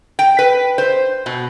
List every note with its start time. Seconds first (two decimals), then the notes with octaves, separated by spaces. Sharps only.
0.19 G5
0.39 B4
0.78 C5
1.26 B2